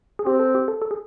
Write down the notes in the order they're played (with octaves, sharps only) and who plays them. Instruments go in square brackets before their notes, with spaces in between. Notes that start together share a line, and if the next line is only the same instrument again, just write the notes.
[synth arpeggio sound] G#4
[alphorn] C4 [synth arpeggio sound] G4
[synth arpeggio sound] A4
G4
A4
A4
G#4